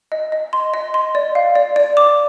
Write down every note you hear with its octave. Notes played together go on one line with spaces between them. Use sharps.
D#5
D#5
C6
D#5
C6
D5
F5
D5
D5
D6